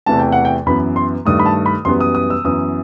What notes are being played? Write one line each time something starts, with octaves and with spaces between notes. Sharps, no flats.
E2 C3 E3 A3 A5
G5
F#5
G5
F#2 E3 B3 B5
C6
G2 D#3 A3 D#6
B5
A5
B5
F#2 E3 G3 B3 C6
D#6
D#6
E6
F#2 E3 B3 D#6